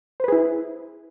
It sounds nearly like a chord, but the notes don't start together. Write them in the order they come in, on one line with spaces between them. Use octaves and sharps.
C5 B4 G#4 E4